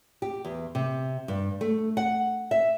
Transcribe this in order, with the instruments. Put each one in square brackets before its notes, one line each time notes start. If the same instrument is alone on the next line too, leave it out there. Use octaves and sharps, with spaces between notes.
[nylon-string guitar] G4
E2
C3
G2
A3
F#5
E5